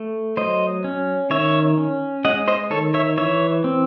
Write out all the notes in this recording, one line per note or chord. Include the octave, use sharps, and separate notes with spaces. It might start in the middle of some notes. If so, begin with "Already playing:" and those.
Already playing: A3
F#3 C5 D#5
C#4
D#3 C#5 E5
C#4
G#3 D#5 F#5
C5 D#5
D#3 A4 C#5
C#5 E5
E3 C#5 E5
C4